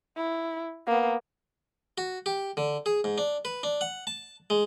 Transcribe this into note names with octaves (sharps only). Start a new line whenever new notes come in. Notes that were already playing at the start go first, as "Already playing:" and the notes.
E4
A#3 B3
F#4
G4
D3
G#4
G#2
D4
B4
D4
F#5
A5
G#3